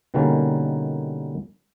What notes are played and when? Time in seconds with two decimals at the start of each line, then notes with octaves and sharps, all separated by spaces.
0.14 B2 D3 D#3 G3 A#3 C#4